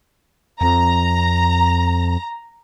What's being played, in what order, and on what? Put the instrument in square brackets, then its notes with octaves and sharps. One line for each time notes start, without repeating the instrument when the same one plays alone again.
[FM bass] F2 [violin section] A#5